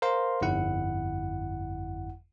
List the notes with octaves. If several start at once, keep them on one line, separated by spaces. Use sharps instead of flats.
A#4 C5 F5 C6
G1 F2 E4 F#5